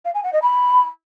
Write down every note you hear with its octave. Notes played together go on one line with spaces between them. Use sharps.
F5
G#5
F#5
D#5
B5